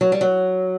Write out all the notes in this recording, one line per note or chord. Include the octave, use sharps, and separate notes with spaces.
F#3
G3
F#3